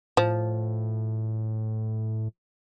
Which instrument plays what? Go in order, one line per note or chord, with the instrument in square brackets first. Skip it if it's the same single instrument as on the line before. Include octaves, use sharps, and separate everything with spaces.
[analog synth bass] A2 [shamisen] F3